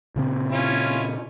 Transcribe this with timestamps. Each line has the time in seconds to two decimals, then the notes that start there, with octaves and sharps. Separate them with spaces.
0.16 A#2 C#3 C4
0.52 C#4 E4 F4